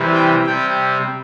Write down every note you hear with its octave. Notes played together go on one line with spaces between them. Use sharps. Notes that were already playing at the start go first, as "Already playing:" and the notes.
Already playing: C3 E3 G3
G5
C3 G3 G5